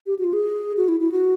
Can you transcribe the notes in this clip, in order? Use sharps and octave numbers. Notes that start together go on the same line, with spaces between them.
G4
F#4
F4
G#4
F#4
E4
E4
F#4